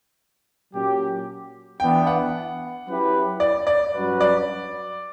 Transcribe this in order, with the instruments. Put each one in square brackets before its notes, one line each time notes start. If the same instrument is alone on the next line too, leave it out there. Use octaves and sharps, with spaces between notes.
[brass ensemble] A#2 F#3 C#4 G4
[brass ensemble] E3 B3 D4 [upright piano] G5
[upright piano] F#5
[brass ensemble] F#3 C#4 E4 G4 B4
[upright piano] D5
D5
[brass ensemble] G2 F#3 C#4 F#4 B4
[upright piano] D5